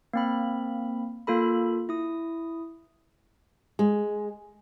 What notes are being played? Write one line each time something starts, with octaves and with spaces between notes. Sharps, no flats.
A#3 C4 B5
A#3 F4 A4 B5
E4 D#6
G#3